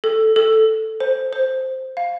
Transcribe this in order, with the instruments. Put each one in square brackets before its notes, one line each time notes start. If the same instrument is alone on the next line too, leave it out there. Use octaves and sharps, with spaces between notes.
[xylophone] A4
A4
C5
C5
F5